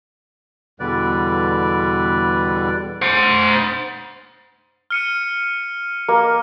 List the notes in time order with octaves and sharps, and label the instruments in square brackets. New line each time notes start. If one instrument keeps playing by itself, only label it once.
[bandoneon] E2 B2 D3 G3 B4 D5
[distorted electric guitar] C5 F#5
[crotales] F6 C#7 D#7
[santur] A#3